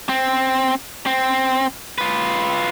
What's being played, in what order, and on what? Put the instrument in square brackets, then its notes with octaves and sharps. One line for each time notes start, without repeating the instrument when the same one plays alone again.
[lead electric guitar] C4
C4
F4 B4